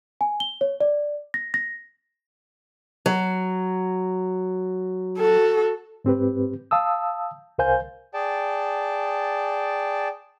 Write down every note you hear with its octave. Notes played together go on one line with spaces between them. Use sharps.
G#5
G7
C#5
D5
A#6
A#6
F#3
F#4 A4
G#2 C4 G4 B4
F5 A5 D#6 E6
C2 A#4 C5 F5 G#5 G6
G#4 D5 G5 A5